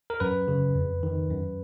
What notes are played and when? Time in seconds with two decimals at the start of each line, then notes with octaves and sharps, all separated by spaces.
0.10 A#4
0.20 F#2 B4
0.48 C#3
0.75 F2
1.03 D#3
1.30 F#2